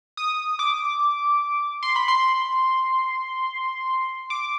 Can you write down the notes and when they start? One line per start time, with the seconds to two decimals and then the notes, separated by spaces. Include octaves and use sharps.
0.17 D#6
0.59 D6
1.83 C6
1.96 B5
2.08 C6
4.30 D6